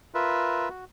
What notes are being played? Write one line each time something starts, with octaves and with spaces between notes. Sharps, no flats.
F4 A#4 B4 E5
F#4